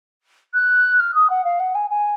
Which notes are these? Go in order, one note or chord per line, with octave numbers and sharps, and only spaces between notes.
F#6
F6
D#6
F#5
F5
F#5
G#5
G#5